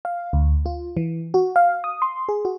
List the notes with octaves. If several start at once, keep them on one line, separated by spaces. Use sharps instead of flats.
F5
D2
F4
E3
F#4
F5
D#6
C6
G#4
F#4